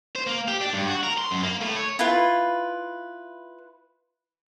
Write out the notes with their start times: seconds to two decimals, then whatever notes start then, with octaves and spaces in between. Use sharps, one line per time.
0.16 C5
0.27 A#3
0.48 G4
0.61 D4
0.73 G2
0.87 F#4
1.04 A#4
1.18 C6
1.31 F#2
1.43 A#3
1.61 A2
1.76 C#5
1.99 E4 F4 B4